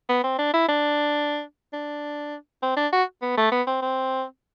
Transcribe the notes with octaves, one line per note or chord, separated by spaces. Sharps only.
B3
C4
D4
E4
D4
D4
C4
D4
F#4
B3
A3
B3
C4
C4